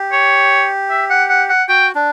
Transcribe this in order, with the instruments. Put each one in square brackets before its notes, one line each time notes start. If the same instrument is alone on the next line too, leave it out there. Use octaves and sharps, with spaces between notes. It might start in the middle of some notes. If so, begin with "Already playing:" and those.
Already playing: [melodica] G4
[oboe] C#5
E5
F#5
F#5
F#5
[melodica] F#4 [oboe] G5
[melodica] D4